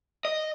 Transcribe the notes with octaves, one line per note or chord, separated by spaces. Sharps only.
D#5